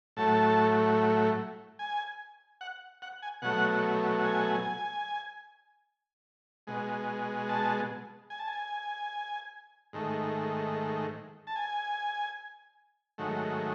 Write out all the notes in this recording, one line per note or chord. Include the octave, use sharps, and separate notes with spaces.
A2 F#3 A3 A5
G#5
F#5
F#5
G#5
B2 F#3 A3 F#5
G#5
B2 G#3
A5
G#5
A5
G#5
G#2 D#3 A3
A5
G#5
G#2 D#3 F#3 A3